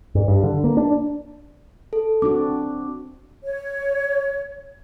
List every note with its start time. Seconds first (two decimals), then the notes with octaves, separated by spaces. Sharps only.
0.15 G2
0.28 G2
0.44 D3
0.64 A#3
0.77 D4
1.93 A4
2.22 C4 D4 F#4 D6
3.43 C#5